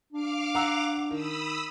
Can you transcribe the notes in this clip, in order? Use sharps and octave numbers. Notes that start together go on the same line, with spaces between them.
D4 F5 D6 F6
F#5 A#5 E6
D#3 B5 D#6 E6